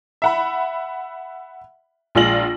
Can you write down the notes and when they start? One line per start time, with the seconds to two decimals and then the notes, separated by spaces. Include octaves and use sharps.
0.22 E5 F#5 B5
2.15 A#1 G#3 F4 D5 A#6 F#7